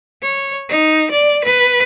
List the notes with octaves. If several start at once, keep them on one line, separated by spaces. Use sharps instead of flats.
C#5
D#4
D5
B4